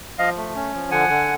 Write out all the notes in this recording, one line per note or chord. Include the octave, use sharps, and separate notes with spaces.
F3 D#5 F5
A3
C#4
F3
D3 F#5 G#5
D3